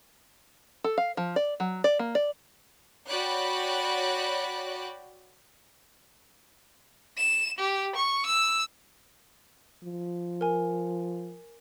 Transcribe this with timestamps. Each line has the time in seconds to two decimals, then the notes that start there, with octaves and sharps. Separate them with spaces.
0.84 A4
0.98 F5
1.17 F3
1.36 D5
1.60 F#3
1.84 D5
1.99 A#3
2.15 D5
3.08 F#4 C#5 D5 G5 B5 F#6
7.17 E7
7.59 G4
7.96 C#6
8.26 E6
9.84 F3
10.41 A#4 G#5